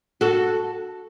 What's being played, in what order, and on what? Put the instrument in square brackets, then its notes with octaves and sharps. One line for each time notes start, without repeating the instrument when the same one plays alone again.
[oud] F#4 A4